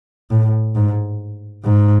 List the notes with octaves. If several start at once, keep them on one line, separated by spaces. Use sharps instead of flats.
A2
G#2
G#2